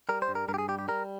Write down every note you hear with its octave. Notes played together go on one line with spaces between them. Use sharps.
G3 A#4
C5
G2
A#4
G2 A#4
G4
G#4
G3 G4
G4
G3 A#4